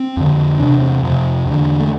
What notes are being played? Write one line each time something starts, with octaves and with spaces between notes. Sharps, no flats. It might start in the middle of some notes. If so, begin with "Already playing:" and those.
Already playing: C4
F2 D3
E2 C3 D4
C4
F2 C3
E2 D3
A3